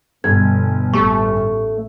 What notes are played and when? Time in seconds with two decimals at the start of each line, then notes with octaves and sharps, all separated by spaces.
0.24 G1 B2 G#6
0.94 A1 A3 G4 C#6